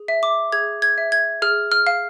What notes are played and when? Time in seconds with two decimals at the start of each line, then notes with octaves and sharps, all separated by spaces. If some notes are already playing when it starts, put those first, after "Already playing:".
Already playing: G#4
0.08 E5
0.23 D6
0.52 G#4 G#6
0.82 G#6
0.98 E5
1.12 G#6
1.42 G#4 F6
1.72 F6
1.87 F5